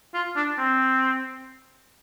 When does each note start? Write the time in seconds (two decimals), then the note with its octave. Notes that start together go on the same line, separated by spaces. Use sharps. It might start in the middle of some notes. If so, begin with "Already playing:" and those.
0.14 F4
0.36 D4
0.58 C4